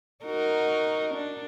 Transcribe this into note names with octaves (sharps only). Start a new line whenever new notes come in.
D#4 F#4 A#4
D4